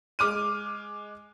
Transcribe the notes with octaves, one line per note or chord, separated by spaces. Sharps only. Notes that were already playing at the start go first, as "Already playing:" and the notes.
G#3 D6 F6 D#7